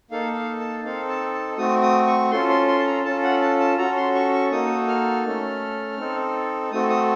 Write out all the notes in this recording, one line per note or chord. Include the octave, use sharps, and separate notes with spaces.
A#3 D#4 A4 F5
F5
A5
C4 D#4 A4 F5
A5
A5
A3 C4 F#4 D#6
D#6
C#6
C#4 F4 A4 C6
C6
C6
A5
A#5
C#4 F4 A4 A5
F#5
A5
A5
C#4 F#4 A4 A#5
C6
C#6
C#6
A#3 D#4 F#4 A4 D#6
F6
A3 C#4 A4
C4 D#4 A4
A3 C4 F#4 A4 D#6
D#6